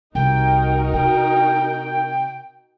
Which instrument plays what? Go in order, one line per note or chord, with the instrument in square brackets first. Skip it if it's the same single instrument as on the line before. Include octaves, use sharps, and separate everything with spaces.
[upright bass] C2 [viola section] D#4 F#4 A#4 [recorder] G5
[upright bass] C3 [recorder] G5